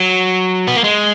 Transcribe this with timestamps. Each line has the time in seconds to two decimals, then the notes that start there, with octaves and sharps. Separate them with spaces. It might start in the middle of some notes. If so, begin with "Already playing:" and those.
Already playing: F#3
0.67 B3
0.76 A#3
0.84 G#3